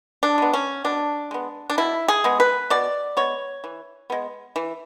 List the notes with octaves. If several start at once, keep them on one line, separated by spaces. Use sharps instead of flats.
D4
G#3 B3
C#4
B2 D4
G#3 B3
D4
B2 E4
G#4
G#3 B3
B4
B2 D5
G#3 B3 C#5
E3
G#3 B3
E3